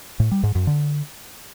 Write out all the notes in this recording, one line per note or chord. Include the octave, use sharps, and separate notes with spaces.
A2
G3
G#2
F#2
D3